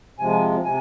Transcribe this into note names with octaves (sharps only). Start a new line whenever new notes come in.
C3 F3 G#3 G#5
C3 G#5